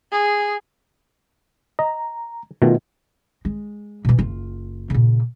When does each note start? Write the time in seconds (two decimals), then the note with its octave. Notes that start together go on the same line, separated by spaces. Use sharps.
0.12 G#4
1.79 D#5 A#5
2.62 B2 D#3 A3 F4
3.45 G#3
4.05 B2 E3
4.18 F#1 F4
4.90 A#2 C#3